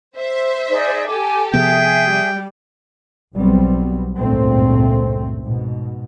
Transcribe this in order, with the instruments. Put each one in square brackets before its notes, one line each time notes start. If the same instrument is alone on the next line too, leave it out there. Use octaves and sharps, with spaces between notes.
[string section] C5 E5
[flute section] D#4 G#4 D5
[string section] G4 A4 [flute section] G#5 D6
[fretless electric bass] C3 F3 B3 [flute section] G#4 E5 [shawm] G5
[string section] G3
[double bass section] B1 F#3 G3 B3 C4
G#1 C#2 G2 A#2 A3 C4
G#2 B2